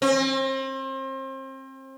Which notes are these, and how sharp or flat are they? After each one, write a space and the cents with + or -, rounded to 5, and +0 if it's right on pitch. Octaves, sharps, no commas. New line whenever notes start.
C4 +35